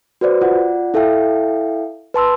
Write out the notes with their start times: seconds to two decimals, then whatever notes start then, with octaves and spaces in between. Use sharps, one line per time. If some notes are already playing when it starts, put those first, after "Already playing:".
0.21 F#4 B4 C5 D5
0.41 F4 D5 F#5
0.94 E4 A4 E5 F5 G5
2.14 B4 A5 C6 E6